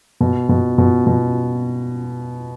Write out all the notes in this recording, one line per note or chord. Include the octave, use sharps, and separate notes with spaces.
B2
B2
B2
B2